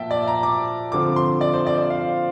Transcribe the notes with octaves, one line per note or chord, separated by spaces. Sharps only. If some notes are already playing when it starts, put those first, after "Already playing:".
Already playing: A#2 F3 A#3 E5 G5 A5
D5
A#5
D6
D3 F3 C4 D6
C6
D5
C5
D5
D5
F5